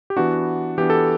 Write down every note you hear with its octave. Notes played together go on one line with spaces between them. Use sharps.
G4
E3 B3 D4 F#4
E3 B3 D4 G4
A4